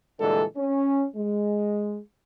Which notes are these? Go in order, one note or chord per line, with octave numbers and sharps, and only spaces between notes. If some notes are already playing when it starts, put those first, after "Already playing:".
A#2 D3 E3 G3 G#3 A4
C#4
G#3